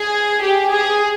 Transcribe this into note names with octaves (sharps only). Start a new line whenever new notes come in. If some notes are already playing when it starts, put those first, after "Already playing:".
Already playing: G#4
G4
G#4